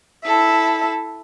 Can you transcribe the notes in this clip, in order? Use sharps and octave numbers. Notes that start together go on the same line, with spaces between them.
E4 A4 E5